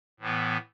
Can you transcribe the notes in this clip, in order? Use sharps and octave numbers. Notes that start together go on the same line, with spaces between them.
A2 E3 B3